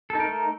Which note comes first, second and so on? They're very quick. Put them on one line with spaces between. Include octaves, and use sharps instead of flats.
A4 D#4 A#4 A3